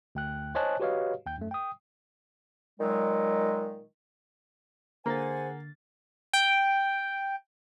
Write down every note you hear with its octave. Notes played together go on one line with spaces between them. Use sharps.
D2 G5 F#6
C5 C#5 D#5 G#5 A5 F#6
F#4 G4 B4 C#5 D#5 F5
D#2 G5 G6
F#2 A3
G5 D#6
A#2 D#3 F#3 G#3
D3 A#3 G#4 C5 F#5 G#5 A6
G5